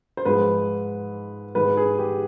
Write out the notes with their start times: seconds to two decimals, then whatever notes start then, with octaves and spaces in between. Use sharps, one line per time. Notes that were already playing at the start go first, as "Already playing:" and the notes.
0.17 C5
0.25 G#2 F3 G#3 B4
1.55 G#2 D#3 G#3 B4
1.77 G#4
1.99 G4